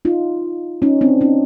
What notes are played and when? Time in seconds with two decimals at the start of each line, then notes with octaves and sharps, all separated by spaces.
0.05 D#4 F4
0.82 C#4 D#4
1.01 C4 D4
1.21 C#4 D#4